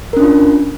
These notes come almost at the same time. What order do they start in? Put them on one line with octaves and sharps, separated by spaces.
A#4 C#4 D4 F4